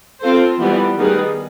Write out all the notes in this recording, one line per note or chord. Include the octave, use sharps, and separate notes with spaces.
C4 F4 A4 C5
E3 G3 B3
D#3 G3 B3 D#4 G#4